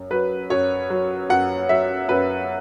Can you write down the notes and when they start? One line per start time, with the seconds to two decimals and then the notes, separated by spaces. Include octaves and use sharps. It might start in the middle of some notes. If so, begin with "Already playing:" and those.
Already playing: F#2
0.10 F#3 B4
0.50 F#2 C#5
0.90 F#3
1.30 F#2 F#5
1.69 F#3 E5
2.08 F#2 B4